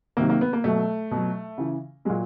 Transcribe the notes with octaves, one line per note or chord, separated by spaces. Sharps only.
C3 D#3 F#3 A#3
A#3
B3
A#3
B2 F#3 A3
B2 F#3
C#3 E3
A#2 F#3 G#3